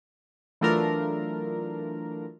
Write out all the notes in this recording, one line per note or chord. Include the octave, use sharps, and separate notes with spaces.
E3 F#3 A3 D4 F4 A#4